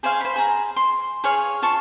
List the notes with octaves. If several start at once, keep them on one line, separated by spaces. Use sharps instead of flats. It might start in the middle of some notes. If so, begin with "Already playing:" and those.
G#4 C5 C#5 F5
C5 B5
G#4 A#5
C6
G#4 C#5 F5
F4 A5 C#6